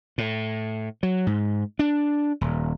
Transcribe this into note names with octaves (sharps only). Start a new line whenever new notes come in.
A2
F#3
G#2
D4
D#1